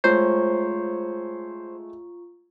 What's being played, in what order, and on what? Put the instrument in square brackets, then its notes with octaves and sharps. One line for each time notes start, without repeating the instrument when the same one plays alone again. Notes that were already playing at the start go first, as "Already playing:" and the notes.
[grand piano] G#3 A3 C#5 [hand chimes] F4 A#5 C#6 [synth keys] C5